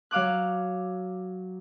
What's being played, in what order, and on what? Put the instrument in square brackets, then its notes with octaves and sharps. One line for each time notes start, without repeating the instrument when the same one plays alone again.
[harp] F#3 F5 D6 F#6